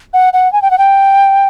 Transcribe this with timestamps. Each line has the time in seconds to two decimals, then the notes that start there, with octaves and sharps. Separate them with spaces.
0.14 F#5
0.33 F#5
0.53 G#5
0.62 G5
0.71 F#5
0.78 G5